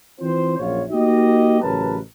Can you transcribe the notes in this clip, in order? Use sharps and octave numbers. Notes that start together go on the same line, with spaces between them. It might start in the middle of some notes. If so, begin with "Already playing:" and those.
E3 C4 F4 C5
A#1 F#2 F#3 F4 C#5
A#3 D#4 F#4 G4 D#5
A1 C#3 F#3 A#4 B4 A5